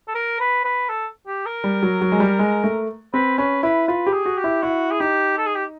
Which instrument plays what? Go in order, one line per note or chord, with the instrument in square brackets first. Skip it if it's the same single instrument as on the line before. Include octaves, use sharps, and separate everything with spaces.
[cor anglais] A4
A#4
B4
B4
A4
G4
A#4
[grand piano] G3
F#3
F#3
G#3
G3
G#3
A3
[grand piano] C4 [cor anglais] B4
[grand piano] C#4 [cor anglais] B4
[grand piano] E4 [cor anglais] B4
[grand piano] F4 [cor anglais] B4
[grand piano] G4
[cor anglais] G#4
[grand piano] F#4
[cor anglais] G4
[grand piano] E4
[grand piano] E4 [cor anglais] F#4
[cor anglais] G#4
[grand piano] D#4 [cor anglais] G4
[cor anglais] A4
G#4
G4